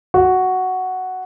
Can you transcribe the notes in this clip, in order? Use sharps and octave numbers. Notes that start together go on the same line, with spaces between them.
F#4